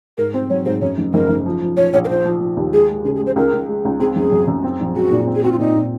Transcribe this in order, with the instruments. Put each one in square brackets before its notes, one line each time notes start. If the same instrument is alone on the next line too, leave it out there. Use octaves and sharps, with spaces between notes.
[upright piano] G#2 [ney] A#4
[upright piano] C4 [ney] C5
[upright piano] F#3 [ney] C#5
[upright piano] G#2 [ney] C5
[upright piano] F#2 [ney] C#5
[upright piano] F#1
[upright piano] F#1 [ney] A#4
[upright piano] F#1
F3
F3
[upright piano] F3 [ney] C#5
[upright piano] A#1 [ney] C#5
[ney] A#4
[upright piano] F3 [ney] C5
[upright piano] F3
F3
D#2
[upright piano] G#3 [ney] G#4
[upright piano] G#3
[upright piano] C#3 [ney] G#4
[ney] G#4
[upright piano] G#3
[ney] C5
[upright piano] C#2 [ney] A#4
[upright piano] C#2
G#3
C#2
[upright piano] C4 [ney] G#4
[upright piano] F#1 [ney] G#4
[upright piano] F#2
F#2
C4
A#1
[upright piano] G#3 [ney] F#4
[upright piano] A#2
C4
[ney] G#4
[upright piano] C4 [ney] F#4
[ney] F4
[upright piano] A#2 [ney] D#4
[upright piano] A#2